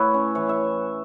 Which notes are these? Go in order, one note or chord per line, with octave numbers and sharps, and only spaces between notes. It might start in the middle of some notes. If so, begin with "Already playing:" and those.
Already playing: A2 E4 B4 C#5 E5
C#4
E3 C#5
E5